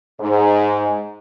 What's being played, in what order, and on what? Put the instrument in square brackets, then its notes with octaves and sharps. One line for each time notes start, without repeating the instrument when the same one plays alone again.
[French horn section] G#2